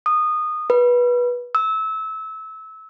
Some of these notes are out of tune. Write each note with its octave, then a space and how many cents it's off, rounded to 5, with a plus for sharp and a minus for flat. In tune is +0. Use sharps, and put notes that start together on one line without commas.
D#6 -20
B4 -20
E6 -25